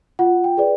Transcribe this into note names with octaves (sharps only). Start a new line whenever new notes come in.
F4 F#5
G5
G#4 B4 D5